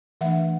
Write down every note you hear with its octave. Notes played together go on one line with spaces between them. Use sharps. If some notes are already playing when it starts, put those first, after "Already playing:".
E3 A3 D4 E5 F#5